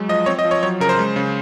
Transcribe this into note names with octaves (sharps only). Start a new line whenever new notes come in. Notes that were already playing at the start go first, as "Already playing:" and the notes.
Already playing: F#3 G#3
F3 D#5
C4 C#5
D#5
F3
C#5
F#3 C#5
C#3 A#4
C5
G#3
C#3